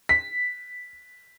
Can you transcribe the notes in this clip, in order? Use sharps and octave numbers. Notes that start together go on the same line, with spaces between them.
B6